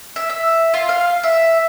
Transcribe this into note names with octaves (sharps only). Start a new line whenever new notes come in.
E5
E5
F4
F5
E5